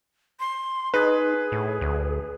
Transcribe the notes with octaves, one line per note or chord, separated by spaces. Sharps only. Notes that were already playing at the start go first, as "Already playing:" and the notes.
C6
D#4 G#4 B4
A2
D2